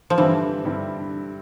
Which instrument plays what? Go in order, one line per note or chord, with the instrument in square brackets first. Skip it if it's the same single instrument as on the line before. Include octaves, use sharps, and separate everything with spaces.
[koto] F3
[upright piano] G2 D3 G3 C4 E4 [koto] E3
[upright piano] G2 D3 G3 C4 E4